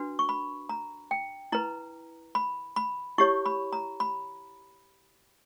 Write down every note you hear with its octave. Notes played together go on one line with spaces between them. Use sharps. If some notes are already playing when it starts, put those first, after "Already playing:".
Already playing: D4 F#4 B4
C#6
B5
A#5
G5
E4 B4 A#5
B5
B5
E4 G4 C#5 C#6
B5
A#5
B5